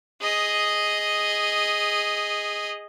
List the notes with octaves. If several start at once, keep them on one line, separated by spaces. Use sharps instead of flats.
G#4 D#5